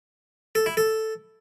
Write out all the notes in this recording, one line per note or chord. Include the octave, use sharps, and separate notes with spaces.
A4
E4
A4